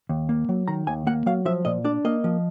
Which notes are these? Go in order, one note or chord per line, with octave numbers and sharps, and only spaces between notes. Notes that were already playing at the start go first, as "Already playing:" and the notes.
D#2
A#3
F#3
D#3 A#5
D#2 G#5
A#3 F#5
F#3 F5
F3 E5
A#2 D#5
D4 D5
A#3 D#5
F3